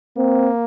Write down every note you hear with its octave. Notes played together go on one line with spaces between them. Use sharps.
A#3 C4